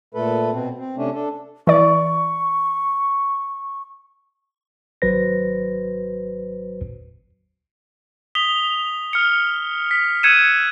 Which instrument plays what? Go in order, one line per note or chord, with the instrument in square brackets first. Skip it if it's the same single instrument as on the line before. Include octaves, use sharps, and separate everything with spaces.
[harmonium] A#2 A3 A4 B4
B2 C4
C4
C3 A3 C#4 D4
D4 A4
[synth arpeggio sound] E3 D5 [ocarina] C#6
[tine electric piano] G#1 F#3 F#4 B4 C5 A#6
[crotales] D#6 B6 F7 G7
F6 C#7
B6
E6 F#6 G#6 C#7 D#7 E7